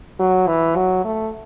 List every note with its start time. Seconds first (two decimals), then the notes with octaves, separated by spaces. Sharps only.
0.19 F#3
0.47 E3
0.76 F#3
1.04 A3